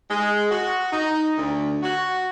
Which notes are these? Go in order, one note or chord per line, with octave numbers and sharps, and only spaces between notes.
G#3
F#4
D#4
D2
F#4